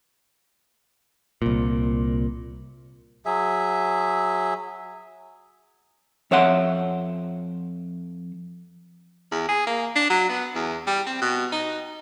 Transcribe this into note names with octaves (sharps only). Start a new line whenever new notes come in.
C2 A#2
F#3 G#4 E5
F2 C#5 E5 F#5 C6
E2
G#4
A#3
D4
F#3
B3
E2
G3
C4
B2
D#4